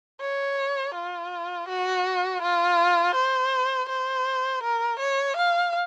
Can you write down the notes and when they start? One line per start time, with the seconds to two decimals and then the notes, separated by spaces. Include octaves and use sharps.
0.21 C#5
0.95 F4
1.69 F#4
2.42 F4
3.15 C5
3.89 C5
4.63 A#4
5.00 C#5
5.37 F5